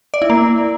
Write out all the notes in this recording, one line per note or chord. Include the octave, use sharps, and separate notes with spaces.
D5
E4
A#3